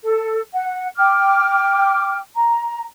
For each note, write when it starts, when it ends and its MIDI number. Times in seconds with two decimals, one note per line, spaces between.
0.02 0.40 69
0.53 0.87 78
0.96 2.18 79
0.96 2.18 86
0.96 2.18 89
2.35 2.85 82